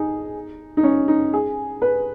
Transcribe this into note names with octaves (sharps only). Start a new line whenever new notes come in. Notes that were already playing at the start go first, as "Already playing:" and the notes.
Already playing: D#4 G#4
D#4
C#4
D#4
G#4
B4